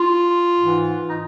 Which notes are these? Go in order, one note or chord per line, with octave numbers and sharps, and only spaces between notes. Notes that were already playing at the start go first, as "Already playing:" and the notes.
Already playing: F4
G#2 E3
D#4